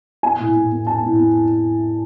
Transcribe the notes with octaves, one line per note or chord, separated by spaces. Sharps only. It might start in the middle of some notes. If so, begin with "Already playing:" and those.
B3 G#5
A2
A2
B3
B3 A5
A2
B3